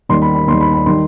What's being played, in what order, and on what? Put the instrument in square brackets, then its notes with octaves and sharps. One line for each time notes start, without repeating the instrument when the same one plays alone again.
[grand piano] D#2 D#3 G3 C6
B5
B5
D#2 D#3 G3 C6
B5
B5
D#3 G3 C6